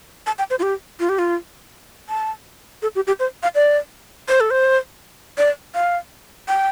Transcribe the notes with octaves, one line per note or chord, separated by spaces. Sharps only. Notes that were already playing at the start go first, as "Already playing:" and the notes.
A5
G5
C5
F4
G4
F4
G4
F4
A5
A4
G4
G4
C5
F5
D5
C5
A4
C5
D5
F5
G5